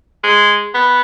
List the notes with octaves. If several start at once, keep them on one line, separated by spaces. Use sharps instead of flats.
G#3
B3